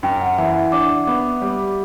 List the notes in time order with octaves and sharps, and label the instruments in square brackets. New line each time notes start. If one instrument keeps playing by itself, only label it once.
[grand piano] F#2 [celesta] G5
[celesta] F#5
[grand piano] E3 [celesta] E5
[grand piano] D4 [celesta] D6
[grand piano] B3
G3